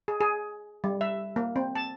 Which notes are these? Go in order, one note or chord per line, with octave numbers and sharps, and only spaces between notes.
G#4
G#4
G3
E5
A#3
C4
A5